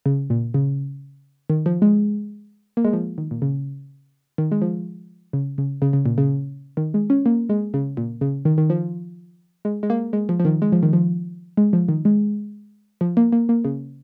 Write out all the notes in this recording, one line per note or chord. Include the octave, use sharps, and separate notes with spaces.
C#3
A#2
C#3
D#3
F3
G#3
A#3
G#3
F3
D#3
A#2
C#3
D#3
G#3
F3
C#3
C#3
C#3
C#3
A#2
C#3
D#3
G#3
C#4
A#3
G#3
C#3
A#2
C#3
D#3
D#3
F3
G#3
G#3
A#3
G#3
F3
F3
D#3
G#3
F3
D#3
F3
G#3
F3
D#3
G#3
F3
A#3
A#3
A#3
C#3